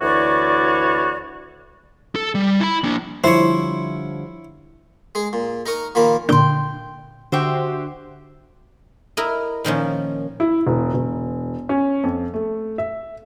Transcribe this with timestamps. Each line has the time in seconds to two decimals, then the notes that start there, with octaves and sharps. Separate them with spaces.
0.01 D2 E3 E4 F#4 C#5 D5
2.16 A4
2.35 G3
2.61 E4 B5
2.84 A#3 D4
3.24 D3 F3 G3 E4 C5 C#5
5.15 G#3 G#4
5.33 A#2
5.66 D#4 A#4 C#6 D#6
5.95 A#2 D#3 F3 A#3 B5
6.29 A#2 D3 G5 C6
7.32 D3 F#4 G4 C5 E5 G5
9.17 E4 A#4 D#5
9.64 A#2 D#3 F3 C#4
10.40 E4
10.67 E1
10.94 E1
11.69 C#4
12.04 F2
12.34 A3
12.78 E5